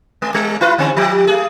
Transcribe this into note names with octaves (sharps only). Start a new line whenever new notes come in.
G#3
G3
E4 F4 B4
D3 G3 C4
F3 G4
A3 G#4